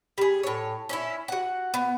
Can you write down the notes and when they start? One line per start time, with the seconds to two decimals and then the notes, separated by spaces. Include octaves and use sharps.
0.18 G3 G#4
0.43 A2 C#5
0.89 C#4 D#4 E4
1.28 F#4 F#5
1.74 B3